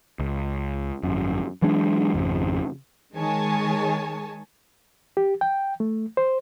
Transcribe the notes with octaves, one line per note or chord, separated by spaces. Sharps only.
C#2
G#1 F#2
E3 F#3 G#3 D4
G#1 F2 C#3
D#3 G#3 C#5 G#5 A5
G4
G5
A3
C5